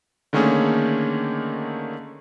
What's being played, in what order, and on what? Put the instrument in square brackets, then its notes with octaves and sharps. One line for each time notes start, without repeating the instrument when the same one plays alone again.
[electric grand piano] D3 D#3 A3 A#3 C#4 G#4